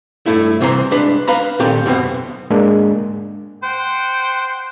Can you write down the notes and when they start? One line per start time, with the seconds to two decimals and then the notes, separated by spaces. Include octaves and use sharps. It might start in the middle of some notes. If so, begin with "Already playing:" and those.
0.26 G2 A3 E4
0.60 C2 C3 E3 G4 C5 A#5
0.91 G#3 D4 B4
1.27 B4 F5 A#5 B5
1.60 A#2 D#3 C4 G4 A4
1.86 F#2 B2 B3 C4
2.50 G#2 G#3 A#3 D4 G#4 A#4
3.63 C5 F#5 G5